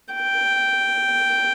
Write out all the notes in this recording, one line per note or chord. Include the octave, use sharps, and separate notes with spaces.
G5